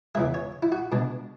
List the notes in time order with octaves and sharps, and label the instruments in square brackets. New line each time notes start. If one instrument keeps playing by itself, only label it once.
[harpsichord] E2 C#3 G#3 E5
C#5
E4
F#4
B2 G#3 D4